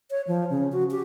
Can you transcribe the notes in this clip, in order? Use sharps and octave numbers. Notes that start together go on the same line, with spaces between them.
C#5
F3
C#3
F#4
G4